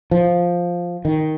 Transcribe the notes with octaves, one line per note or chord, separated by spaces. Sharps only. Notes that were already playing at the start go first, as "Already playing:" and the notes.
F3
D#3